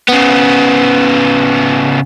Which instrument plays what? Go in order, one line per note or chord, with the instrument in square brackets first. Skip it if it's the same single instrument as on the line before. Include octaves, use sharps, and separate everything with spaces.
[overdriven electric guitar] C#3 B3